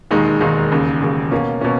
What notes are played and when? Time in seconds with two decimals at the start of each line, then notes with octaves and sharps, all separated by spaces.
0.11 E1 D#2 D#3 G#3 D#4
0.40 E1 D#2 D#3 G#3 D#4
0.72 E1 D#2 C#3
1.02 E1 D#2 C#3
1.32 B2 A#3 C#4
1.61 B2 A#3 C#4